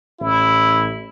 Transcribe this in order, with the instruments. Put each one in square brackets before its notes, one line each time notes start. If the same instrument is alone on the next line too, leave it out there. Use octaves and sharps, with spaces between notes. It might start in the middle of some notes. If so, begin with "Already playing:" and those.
[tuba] A1 [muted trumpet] E4